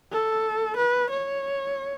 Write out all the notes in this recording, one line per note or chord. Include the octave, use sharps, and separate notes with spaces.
A4
B4
C#5